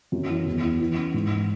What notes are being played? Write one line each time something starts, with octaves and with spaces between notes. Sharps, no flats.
F#2
E3
E2
E3
E3
C#4
G#2
E3